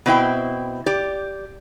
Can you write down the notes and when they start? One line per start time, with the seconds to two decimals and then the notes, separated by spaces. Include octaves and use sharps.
0.06 B2 C4 E4 G5
0.86 G4 D5